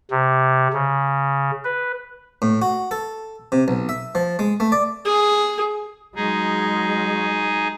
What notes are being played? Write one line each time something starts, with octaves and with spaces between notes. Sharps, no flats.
C3
C#3
B4
A2
F#4
A4
C3
B1
E5
F3
G#3
A3
D5
G#4
F#3 G#3 D#4 G#4